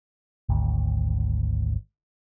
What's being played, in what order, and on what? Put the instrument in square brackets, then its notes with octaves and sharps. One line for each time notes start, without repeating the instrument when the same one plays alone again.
[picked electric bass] G#1 D2